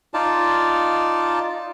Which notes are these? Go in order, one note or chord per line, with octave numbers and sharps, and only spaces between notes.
D#4 F4 D5 A5